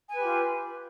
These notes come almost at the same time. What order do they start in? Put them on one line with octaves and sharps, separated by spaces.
G#5 B4 G4 F4